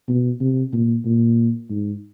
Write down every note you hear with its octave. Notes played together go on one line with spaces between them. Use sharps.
B2
C3
A#2
A#2
G#2